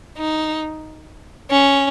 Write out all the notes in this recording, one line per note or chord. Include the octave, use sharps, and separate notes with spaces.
D#4
C#4